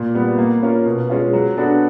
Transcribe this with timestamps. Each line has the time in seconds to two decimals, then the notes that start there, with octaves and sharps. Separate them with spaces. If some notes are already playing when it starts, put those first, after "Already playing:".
Already playing: A#2
0.15 G3 B3
0.38 A#3
0.62 C#4 F4 A#4
0.86 B2
1.10 G#3 C#4 F4
1.33 F#3
1.57 B3 D4 F#4 A4